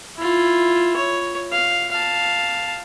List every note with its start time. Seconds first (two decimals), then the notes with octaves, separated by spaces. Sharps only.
0.17 E4 F4
0.96 C#5
1.53 F5
1.92 F5 A5